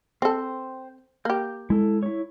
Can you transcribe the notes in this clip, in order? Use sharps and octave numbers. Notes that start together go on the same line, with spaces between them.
C4 A4 C5 G5
A#3 G4 G6
G#3 E4 A4
E4 C#5